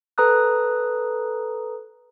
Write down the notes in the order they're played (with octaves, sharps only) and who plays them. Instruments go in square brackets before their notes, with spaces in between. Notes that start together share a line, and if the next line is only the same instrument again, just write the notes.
[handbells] A4 B4 A#5 D#6 F#6